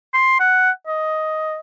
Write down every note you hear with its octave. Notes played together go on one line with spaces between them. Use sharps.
C6
F#5
D#5